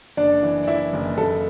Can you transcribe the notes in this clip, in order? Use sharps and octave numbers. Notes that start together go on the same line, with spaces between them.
F#1 D4 D5
E3
D5
E3 E4 E5
F#1
F#1 A4 A5